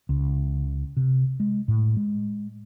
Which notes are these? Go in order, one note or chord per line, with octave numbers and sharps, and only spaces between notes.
C#2
C3
G#3
A2
G#3